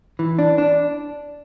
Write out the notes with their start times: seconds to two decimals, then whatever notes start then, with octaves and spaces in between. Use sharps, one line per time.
0.19 E3
0.39 D4
0.58 D4